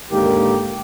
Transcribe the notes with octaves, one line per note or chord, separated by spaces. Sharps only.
G#2 D3 D#3 A#3 G4